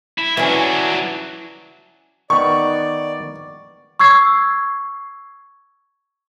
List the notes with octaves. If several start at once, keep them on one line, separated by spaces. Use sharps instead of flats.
E4
E3 F#3 C#4 D4
D#3 B3 D5 C#6
C#6 E6 G#6 C7